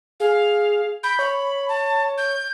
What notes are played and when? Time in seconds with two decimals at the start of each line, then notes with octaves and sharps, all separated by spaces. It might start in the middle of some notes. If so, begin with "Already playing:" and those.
0.20 G#4 F5
1.03 B5 G6
1.19 C#5 B5
1.69 A5
2.18 G6